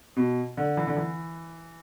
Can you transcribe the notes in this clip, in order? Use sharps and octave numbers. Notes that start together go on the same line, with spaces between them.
B2
D3
E3
D3
E3